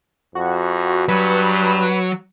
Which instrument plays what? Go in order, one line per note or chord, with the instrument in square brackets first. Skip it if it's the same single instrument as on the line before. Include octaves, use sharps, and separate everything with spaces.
[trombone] F2 [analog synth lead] F#4
[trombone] G2 [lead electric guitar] F#3 [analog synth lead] B4